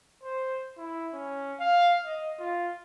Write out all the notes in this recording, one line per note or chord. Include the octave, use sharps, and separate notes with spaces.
C5
E4
C#4
F5
D#5
F4